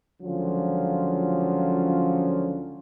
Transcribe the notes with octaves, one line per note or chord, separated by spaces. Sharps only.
C#2 D3 F3 F#3 C#4 F4